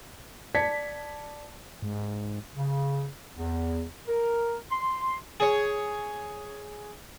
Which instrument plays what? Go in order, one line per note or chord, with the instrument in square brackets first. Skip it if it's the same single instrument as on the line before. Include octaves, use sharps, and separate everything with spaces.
[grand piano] D5 A5 G#6 B6 C#7
[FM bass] G#2
[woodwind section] C#3
E2
A#4
C6
[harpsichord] G#4 C#5